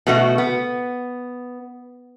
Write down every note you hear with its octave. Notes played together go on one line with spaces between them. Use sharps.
B2 A3 F#4
B3